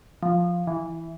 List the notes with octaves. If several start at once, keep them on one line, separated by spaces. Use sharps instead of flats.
F3
E3